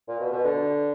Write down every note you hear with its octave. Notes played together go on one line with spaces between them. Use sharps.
A#2
B2
B2
D3